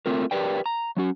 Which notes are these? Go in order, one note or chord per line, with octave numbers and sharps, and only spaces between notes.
A3 C4 F4 A#4
G4 A#4 B4 D5 G5
A#5
F#3 C#4 F#4